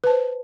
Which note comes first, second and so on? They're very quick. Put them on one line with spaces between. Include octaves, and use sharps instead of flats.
B4 A5 C5